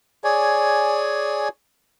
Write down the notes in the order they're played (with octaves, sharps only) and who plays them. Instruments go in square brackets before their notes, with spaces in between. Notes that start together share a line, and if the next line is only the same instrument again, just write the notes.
[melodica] G#4 C#5 D5 G#5